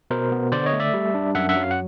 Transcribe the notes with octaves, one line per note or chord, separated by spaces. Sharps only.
B2 A#4 C5
B3
D3 C5 D5
C#5 D#5
A3
D5 E5
G3
D4
F#2 E5 F#5
E5 F#5
F#3
F5
F#5